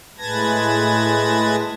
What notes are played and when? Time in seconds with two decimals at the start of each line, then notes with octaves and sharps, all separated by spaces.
0.18 A2 G#3 B4 A5 G#6 A#6